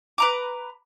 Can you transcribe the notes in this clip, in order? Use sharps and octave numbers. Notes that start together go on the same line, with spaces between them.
B4 A#5 D6